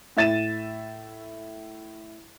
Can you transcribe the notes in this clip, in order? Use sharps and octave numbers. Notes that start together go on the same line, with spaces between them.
A2 E5 A6 D#7 E7